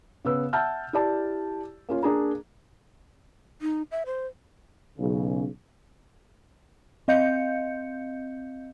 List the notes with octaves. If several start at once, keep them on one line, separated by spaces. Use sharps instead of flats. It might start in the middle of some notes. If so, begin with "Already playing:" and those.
C#3 B3 E6
E5 F#5 A5 E6 F6 G6
E4 G4 D5 A5
A#3 C#4 F4
A#3 D4 G#4 A#5
D#4
E5
C5
B1 C#3
C4 D#5 F5 G6 C#7